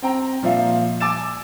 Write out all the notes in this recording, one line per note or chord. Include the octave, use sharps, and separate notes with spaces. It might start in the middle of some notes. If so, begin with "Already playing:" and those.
C4 G5 A#5
A#2 F3 E5 F5
G#5 D6 E6 A6 E7